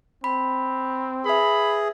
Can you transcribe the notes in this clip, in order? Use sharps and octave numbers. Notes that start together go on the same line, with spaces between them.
C4 B5
G#4 B4 E5 B5